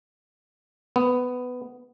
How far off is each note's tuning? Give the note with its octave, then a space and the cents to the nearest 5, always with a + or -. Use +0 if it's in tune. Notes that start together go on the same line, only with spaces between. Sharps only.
B3 +10